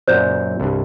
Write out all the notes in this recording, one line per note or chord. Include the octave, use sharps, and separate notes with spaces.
F#2 A#2 F#3 C5 D5 G6
C2 G2